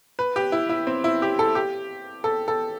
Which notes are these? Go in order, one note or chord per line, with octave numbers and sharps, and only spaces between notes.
B4
G4
E4
E4
C4
E4
G4
A4
G4
A4
A4